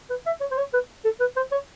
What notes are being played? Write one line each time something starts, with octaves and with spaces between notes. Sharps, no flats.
B4
E5
C#5
C5
C#5
B4
A4
B4
C5
C#5